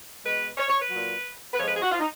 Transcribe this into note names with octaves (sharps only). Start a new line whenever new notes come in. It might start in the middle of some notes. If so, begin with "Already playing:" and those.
B2 G#3 B4
C#5
C#5
B4
A#2 F#3
B4
F2 F3 G#3 C#5
B4
G#4
F#4
F4
D#4